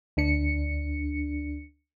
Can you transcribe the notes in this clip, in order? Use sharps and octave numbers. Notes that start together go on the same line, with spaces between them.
D2 D4 C#7